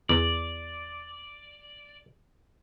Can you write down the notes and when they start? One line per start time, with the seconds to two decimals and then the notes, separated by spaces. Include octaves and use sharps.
0.09 E2 D5